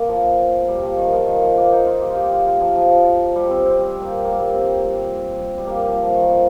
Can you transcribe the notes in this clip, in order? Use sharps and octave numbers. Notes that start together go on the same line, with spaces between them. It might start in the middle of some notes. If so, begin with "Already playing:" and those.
Already playing: A#3
F3
G3
F3
D#3
F3
D#3
F3
A#3
D#4
F4
G4
F4
G4
F4
F4
F3
F3
F3
G3
C4
C4
G4
A#3
A#3
G3
C4
G3
A#3
G3
F3
F3
D#3
F3